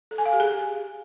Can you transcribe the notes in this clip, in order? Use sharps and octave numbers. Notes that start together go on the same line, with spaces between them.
A4
G#5
F5
G4
G#4